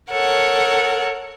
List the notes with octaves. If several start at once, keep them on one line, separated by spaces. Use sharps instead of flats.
A4 A#4 C#5 F#5